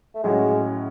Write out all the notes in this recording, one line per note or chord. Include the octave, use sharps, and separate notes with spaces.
A3
A2 F#3 G#3 C#4